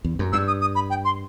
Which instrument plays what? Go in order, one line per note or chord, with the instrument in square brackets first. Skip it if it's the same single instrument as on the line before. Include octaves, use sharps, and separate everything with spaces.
[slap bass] E2
F#2
[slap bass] G2 [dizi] E6
[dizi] D#6
D#6
B5
G5
C6